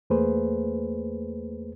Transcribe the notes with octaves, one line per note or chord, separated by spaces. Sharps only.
E2 A3 A#3 G#4 B4 C5